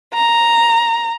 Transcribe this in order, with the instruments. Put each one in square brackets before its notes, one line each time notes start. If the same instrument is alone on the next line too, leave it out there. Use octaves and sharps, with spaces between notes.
[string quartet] A#5